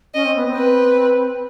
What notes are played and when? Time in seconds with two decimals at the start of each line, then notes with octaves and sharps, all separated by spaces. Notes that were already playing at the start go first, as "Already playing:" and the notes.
0.14 C#4 D#5
0.25 C4
0.36 B3
0.46 C4
0.56 B4